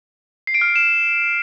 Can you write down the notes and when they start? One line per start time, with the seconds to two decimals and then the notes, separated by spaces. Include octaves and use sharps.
0.47 C7
0.54 D7
0.61 F6
0.69 D7
0.76 E7